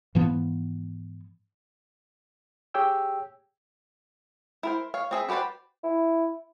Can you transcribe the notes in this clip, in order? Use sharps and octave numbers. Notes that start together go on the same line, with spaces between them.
G#2 E3 F3 B3
G4 G#4 C#5 G5 E6
E4 A#4 C5
C#5 F5
C4 G#4 E5
F#4 G4 B4 C5 D5
E4